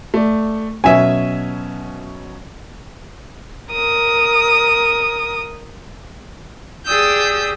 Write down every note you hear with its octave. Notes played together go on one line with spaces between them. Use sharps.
A3 D5
B2 F#3 C#4 E5 G#5
A#4 D#6
G4 G#4 D5 D#6 E6 G6